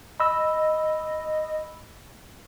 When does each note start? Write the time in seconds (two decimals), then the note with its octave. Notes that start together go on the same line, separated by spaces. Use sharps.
0.20 D#5 B5 E6